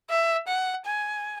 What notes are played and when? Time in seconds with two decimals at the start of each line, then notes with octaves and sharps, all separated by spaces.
0.10 E5
0.47 F#5
0.86 G#5